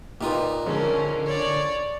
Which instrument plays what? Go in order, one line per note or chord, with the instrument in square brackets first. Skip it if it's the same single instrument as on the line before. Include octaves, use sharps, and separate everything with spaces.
[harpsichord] A#2 D#4 F4 [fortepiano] G4 B4
[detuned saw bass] D3 [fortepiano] F3 G#3 [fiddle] C#4 A#4
[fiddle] C#5 D5